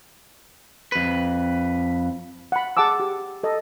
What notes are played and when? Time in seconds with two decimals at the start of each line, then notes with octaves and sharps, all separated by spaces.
0.92 F2 B4
2.52 F#5 B5
2.77 G#4 F#5 A5 D6 E6
3.00 G4
3.43 A4 D#5